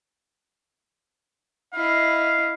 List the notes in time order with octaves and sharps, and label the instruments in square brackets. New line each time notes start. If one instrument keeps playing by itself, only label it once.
[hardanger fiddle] E4 D#5 [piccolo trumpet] F5